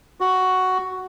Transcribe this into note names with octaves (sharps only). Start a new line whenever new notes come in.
F#4